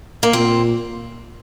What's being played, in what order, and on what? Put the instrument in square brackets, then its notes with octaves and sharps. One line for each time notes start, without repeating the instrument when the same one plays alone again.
[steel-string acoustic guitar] A#3
[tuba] A#2 [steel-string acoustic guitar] C4